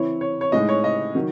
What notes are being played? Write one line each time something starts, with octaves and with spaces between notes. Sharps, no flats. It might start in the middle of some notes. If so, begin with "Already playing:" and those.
Already playing: E3 C4 E4 C#5
C#5
C#5
A2 G#3 D#4 D#5
C#5
D#5
D#3 F#3